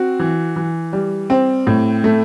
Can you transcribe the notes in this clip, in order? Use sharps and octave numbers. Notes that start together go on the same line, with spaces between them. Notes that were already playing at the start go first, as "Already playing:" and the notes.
Already playing: C4 F#4
E3
E3
G3
C4
A2
A3